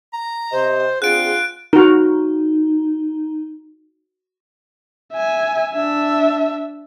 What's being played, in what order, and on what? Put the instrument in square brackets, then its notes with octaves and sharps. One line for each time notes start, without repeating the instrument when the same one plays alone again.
[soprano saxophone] A#5
[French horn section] C3 G4 D#5 [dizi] C5
[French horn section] C4 D4 G#4 [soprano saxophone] F4 [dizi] F#5 [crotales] F#6 D7
[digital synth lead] D#4 [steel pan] F#4 A#4
[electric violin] E5 G#5
D4 E5